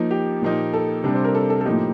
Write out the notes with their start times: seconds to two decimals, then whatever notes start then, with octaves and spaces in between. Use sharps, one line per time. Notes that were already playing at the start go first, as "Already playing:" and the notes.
Already playing: F3 A#3 D#4
0.11 G4
0.42 A#2 F3 A#3 D#4
0.73 A4
1.04 C3 G3 D4
1.14 C5
1.24 A#4
1.35 A4
1.50 A4
1.61 A4
1.65 A2 F3 A#3 D#4 G4